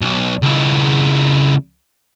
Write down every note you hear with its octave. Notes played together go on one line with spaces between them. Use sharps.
B1
C#2 E4